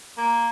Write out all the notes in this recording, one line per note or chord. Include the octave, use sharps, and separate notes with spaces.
A#3